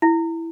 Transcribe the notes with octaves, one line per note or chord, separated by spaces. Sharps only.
E4